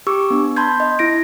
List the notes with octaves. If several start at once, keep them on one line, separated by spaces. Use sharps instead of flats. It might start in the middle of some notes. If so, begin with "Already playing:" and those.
G4 C#6 D6 E6
B3 D4
A5 B5 C6 G6 G#6
D#5
E4 A#6 D7